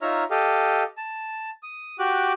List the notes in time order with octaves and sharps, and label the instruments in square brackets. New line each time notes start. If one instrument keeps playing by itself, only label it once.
[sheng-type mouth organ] D#4 F4 C#5 E5 A#5 F6
G4 A4 D#5 F5
A5
D#6
F#4 G4 D6 F#6